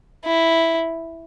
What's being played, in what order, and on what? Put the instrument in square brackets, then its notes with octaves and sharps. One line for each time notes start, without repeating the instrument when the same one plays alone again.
[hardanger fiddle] E4